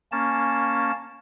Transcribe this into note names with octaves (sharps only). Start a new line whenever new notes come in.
A#3 C#4 A5